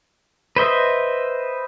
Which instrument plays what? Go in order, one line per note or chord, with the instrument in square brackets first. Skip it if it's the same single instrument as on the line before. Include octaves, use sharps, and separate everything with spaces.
[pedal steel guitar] B4 C5 D#5 E5